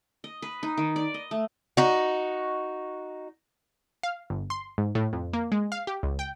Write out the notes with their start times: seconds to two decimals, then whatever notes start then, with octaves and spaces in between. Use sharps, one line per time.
0.24 D#5
0.42 B4
0.63 D#4
0.77 D#3
0.96 D5
1.14 D#5
1.31 A3
1.77 D#4 F#4
4.03 F5
4.30 G1
4.50 C6
4.78 G#2
4.95 A2
5.13 F2
5.33 A#3
5.52 G#3
5.72 F5
5.87 G4
6.03 C#2
6.19 G5